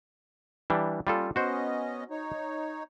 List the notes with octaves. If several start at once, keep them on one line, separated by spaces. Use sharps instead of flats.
E3 G3 D4
G3 A#3 C#4 F4 A4
B3 C#4 F#4 C5 D#5
D#4 C#5